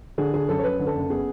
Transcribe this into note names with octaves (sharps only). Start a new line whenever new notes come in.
D3 G#4
D3 G#4
F#2 A4
C#5
F#2 B4
D3
A4
F#1
B3 G#4